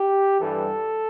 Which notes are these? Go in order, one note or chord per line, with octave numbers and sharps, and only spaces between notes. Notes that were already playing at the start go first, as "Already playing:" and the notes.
Already playing: G4
G2 E3 G3 A4